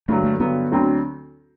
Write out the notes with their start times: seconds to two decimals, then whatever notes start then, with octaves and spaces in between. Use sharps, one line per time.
0.08 G2 D3 F#3 A3
0.24 A3
0.40 G2 D3 F#3 B3
0.72 D2 D3 F#3 C4